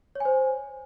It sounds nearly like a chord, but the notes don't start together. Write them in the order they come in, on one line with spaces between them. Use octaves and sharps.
C#5 G#5 C5